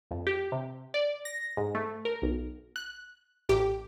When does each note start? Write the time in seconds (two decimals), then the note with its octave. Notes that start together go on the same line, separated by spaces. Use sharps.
0.11 F2
0.27 G4
0.52 C3
0.94 D5
1.25 A#6
1.57 G#2
1.75 A3
2.05 A#4
2.22 B1
2.76 F#6
3.49 A1 G4 D6